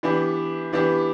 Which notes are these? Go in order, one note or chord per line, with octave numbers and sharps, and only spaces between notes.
E3 B3 D4 G4
E3 B3 D4 G4